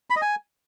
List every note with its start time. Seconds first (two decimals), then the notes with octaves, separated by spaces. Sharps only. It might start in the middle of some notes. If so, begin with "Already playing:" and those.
0.10 B5
0.16 D#5
0.22 G#5